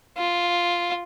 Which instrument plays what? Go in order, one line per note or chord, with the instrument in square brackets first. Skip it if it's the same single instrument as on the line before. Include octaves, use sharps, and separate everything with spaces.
[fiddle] F4